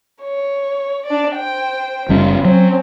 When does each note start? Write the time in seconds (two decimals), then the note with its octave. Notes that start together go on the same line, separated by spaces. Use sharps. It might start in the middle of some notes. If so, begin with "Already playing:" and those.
0.23 C#5
1.06 D4 D5
1.37 C5 G5
2.09 F#1 G3 C#4 F4
2.45 F#3 C4 C#4